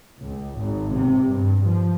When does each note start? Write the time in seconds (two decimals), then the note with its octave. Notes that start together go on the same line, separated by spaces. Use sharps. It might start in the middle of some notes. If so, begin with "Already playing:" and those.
0.20 C#2
0.57 G#1
0.92 C3
1.29 G2
1.64 F3